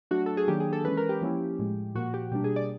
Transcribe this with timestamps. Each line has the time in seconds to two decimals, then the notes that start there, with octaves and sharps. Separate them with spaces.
0.11 F#3 A3 D4 F#4
0.26 A4
0.37 G#4
0.48 D#3 F#3 A#3 D4 G4
0.60 G#4
0.73 A4
0.84 E3 G#3 C#4 B4
0.97 A#4
1.09 G4
1.21 F3 A#3 C#4 E4
1.59 A2 F3 G#3
1.95 A#2 F3 A#3 F#4
2.14 G4
2.31 B2 G3 A#3 D4 G4
2.44 G#4
2.56 D5